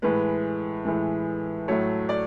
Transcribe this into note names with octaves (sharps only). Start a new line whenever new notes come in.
A2 E3 G#3 B4
A2 E3 G#3
A2 F#3 A3 C#5
D5